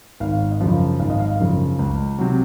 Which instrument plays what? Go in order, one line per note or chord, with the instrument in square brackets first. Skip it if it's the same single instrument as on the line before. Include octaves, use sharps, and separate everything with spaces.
[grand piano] G#1 F5
D#5
F#2 C#3 F3 F5
G#1 F5
D#5
F5
F#2 C#3 F3
C#2
C3 F#3